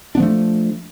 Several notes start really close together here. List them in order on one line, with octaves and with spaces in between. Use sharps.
D4 B3 F3 A3